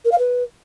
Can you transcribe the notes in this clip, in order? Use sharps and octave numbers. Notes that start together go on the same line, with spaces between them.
A#4
F5
B4